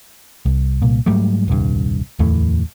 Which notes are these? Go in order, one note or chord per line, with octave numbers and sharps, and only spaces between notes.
C2
C2 A#2
G#2 F#3 G3 A3
D#1 C2 G2
D1 E2 E3 A3